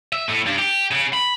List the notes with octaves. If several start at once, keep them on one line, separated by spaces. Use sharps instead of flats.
E5
A2
G2
G4
C#3
B5